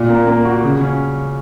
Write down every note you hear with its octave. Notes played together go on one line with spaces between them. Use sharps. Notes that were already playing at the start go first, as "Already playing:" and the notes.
Already playing: A#2
A#3
A#3
F#4
C#3
C#4